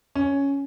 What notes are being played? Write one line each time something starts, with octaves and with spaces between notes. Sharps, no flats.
C#4